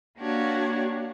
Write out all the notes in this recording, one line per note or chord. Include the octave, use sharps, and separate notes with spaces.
A#3 D4 F#4 G4 C#5